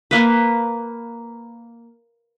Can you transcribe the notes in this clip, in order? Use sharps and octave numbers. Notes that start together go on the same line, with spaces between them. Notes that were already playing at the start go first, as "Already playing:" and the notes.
A#3 B4